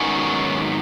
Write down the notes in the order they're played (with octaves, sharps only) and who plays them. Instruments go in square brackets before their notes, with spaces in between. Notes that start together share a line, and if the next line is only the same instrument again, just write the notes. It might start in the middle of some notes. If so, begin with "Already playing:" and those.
Already playing: [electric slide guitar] G#2 D#3 F#3 B3 C#4